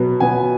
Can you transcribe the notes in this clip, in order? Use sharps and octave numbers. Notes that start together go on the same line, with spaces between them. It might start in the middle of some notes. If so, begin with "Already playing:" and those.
Already playing: B2 F#3 B3
B2 F#3 B3 G#5